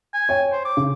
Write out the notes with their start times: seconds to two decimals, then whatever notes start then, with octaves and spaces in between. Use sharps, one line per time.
0.14 G#5
0.29 C#5 G5
0.52 C5
0.65 D6
0.77 C#3